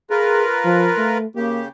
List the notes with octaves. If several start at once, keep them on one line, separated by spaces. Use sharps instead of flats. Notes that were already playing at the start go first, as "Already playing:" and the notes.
F4 G#4 A#4 B4
F3
A3
C#3 A#3 G4